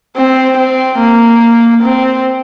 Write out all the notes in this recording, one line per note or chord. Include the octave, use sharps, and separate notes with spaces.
C4
C4
A#3
C4